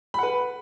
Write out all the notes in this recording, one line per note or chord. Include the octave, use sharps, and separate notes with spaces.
B4 F#5 B5